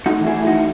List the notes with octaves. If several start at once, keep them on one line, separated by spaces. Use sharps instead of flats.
A2 D#4 F#4
E3
E4 G#4
A2
D#4 F#4
E3